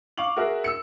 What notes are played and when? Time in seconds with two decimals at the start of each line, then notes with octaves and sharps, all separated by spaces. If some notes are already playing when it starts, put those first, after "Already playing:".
0.17 F5 C#6 D6 F#7
0.37 F#4 G#4 A#4 E5
0.64 E6 C#7